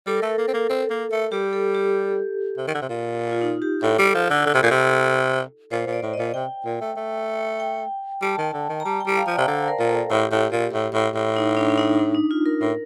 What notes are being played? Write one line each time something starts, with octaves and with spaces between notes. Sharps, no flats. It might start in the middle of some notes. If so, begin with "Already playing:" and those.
G3 A4
A#4
A3 A4
A#3
C4
A#3
C4
A#3
A3
G3 G4
A4
G4
C3
D#3
D3
C3
A#2
F4
D#4
G4
A2 A4
G3
F3
D3
D3
C3
A#2
C3
A#2 C5
A#2
D5
A2
D#5
A#2
C3 G5
A#2
A3
A3
G5
G3 A5
D#3
D3
D#3
A#5
G3 A5
G5
G3
F5
F3 D5
C3
D3 C5
A#4
A#2
A4
A2 G4
A2
A#2
A2
A2
A2
D#4
D4
D4
D#4
D#4
D#4
F4
A#4
A2 A#4